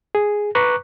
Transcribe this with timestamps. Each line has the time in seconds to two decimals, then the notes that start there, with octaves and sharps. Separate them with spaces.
0.15 G#4
0.55 B4 A#5 C#6 D6 F#6